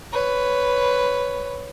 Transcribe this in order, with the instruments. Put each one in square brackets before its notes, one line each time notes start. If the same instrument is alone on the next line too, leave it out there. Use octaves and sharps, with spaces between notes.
[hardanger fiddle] B4 C#5